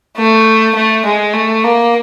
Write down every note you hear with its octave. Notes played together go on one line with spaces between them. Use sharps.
A3
A3
G#3
A3
A#3